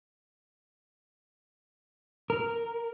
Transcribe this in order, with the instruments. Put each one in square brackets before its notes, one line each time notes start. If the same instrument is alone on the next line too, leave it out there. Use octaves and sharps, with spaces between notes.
[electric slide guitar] A#4